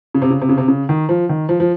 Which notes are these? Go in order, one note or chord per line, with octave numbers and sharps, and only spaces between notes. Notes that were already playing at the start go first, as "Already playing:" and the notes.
C#3
C3
C#3
C3
C#3
C3
C#3
D#3
F3
D#3
F3
F3